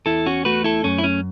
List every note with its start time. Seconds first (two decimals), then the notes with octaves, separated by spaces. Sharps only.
0.06 E2 E4 A4
0.26 C#4 F#4
0.45 A3 F#4 B4
0.64 E4 A4
0.84 F#2 C#4
0.98 E4
1.04 C#4